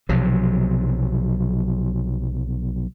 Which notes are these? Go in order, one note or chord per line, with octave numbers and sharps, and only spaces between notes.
B1 C3 F3 F#3